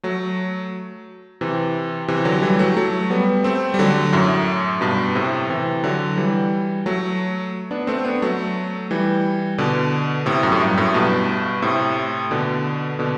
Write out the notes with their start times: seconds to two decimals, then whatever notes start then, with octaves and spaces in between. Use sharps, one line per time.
0.03 F#3 A3
1.41 C3 E3
2.08 C3 E3
2.25 D3 F#3
2.42 E3 G3
2.59 F#3 A3
2.77 F#3 A3
3.10 G3 B3
3.44 A3 C4
3.74 G3
3.79 D3 F#3
4.13 F#2 A2
4.81 G2 B2
5.15 A2 C3
5.49 C3 E3
5.84 D3 F#3
6.17 E3 G3
6.86 F#3 A3
7.71 B3 D4
7.87 A3 C4
8.04 B3 D4
8.22 F#3 A3
8.91 E3 G3
9.58 B2 D3
10.26 A2 C3
10.43 F#2
10.52 A2
10.61 G2
10.77 F#2 A2
10.94 G2 B2
11.62 A2 C3
12.31 B2 D3
12.99 B2 D3